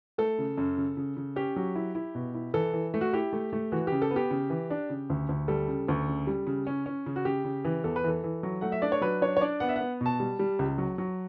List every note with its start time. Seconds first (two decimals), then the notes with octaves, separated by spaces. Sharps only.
0.18 A3 A4
0.38 C#3
0.58 F#2
0.77 C#3
0.97 C#3
1.17 C#3
1.36 C#4 G4
1.56 F#3
1.75 E4
1.95 E4
2.15 B2
2.34 E4
2.54 E3 A4
2.73 E3
2.94 A3
3.01 F#4
3.13 E4 G4
3.33 A3
3.53 A3
3.72 E3 F#4
3.87 C#3 G4
4.02 A4
4.11 B3
4.16 G4
4.31 C#3
4.50 E3
4.70 D4
4.90 C#3
5.10 D2
5.29 D2
5.48 G3 A4
5.68 C#3
5.88 D2
6.08 C#3
6.27 G3
6.47 C#3
6.67 C#4
6.86 C#4
7.06 C#3
7.16 F#4
7.25 C#3 G4
7.45 C#3
7.65 E3
7.84 E2 A4
7.96 B4
8.04 E3 A4
8.24 E3
8.43 F#3
8.61 A3 F#5
8.72 E5
8.82 D4 D5
8.92 C#5
9.01 F#3 B4
9.21 D4 C#5
9.37 C#5
9.41 D4 D5
9.60 B3 F#5
9.69 E5
9.76 B3 F#5
10.01 B2 A5
10.20 G3
10.39 G3
10.59 C#2
10.78 F#3
10.98 F#3